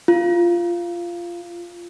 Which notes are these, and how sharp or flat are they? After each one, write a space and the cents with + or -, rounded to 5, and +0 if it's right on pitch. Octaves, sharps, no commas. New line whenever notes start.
F4 -15